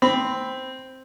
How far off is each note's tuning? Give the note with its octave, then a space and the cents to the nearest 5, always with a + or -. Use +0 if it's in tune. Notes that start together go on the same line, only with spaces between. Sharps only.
C4 +0 B5 +10